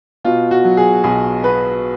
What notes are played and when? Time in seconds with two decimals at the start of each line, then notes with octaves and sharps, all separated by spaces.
0.24 B2 F4
0.51 F#4
0.64 F#3
0.77 G#4
1.04 B1 G#4
1.43 B3 B4